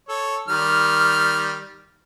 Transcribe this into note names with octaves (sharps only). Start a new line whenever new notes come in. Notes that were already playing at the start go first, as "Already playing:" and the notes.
A4 C#5
D#3 G3 F6